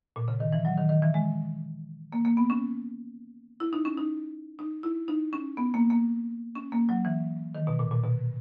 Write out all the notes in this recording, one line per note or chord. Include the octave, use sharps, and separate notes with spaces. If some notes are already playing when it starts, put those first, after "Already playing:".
A#2
C#3
D#3
E3
F#3
D#3
D#3
E3
G#3
A#3
A#3
B3
C#4
E4
D#4
C#4
D#4
D#4
E4
D#4
C#4
B3
A#3
A#3
C#4
A#3
F#3
E3
D#3
B2
A#2
A#2
B2